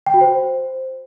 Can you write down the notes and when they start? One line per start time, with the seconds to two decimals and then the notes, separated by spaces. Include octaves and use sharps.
0.06 G5
0.14 F#4
0.21 C5